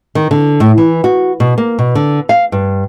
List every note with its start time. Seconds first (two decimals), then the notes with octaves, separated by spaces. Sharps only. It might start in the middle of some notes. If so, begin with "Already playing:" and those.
0.15 D#3
0.31 D3
0.60 A2
0.78 E3
1.04 F#4
1.40 B2
1.58 A#3
1.79 B2
1.95 D3
2.29 F5
2.52 G2